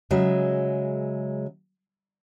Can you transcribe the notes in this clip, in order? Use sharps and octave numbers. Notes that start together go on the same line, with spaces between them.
C#3 F#3 G#3 E5